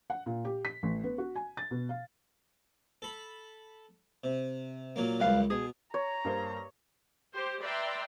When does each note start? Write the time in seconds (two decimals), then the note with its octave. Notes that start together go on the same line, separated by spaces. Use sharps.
0.10 F#5
0.26 A#2
0.45 G4
0.65 B6
0.83 A1
1.04 B3
1.18 F#4
1.36 G#5
1.57 A6
1.71 B2
1.89 F5
3.02 A4 B5
4.24 C3
4.96 A#2 F#3 A#3
5.20 C#2 F#2 G3 B4 F5
5.50 B2 G#4
5.94 C#5 A#5
6.25 G2 A#3 C5
7.34 G4 C5
7.63 B4 D5 E5 G5 A#5 C6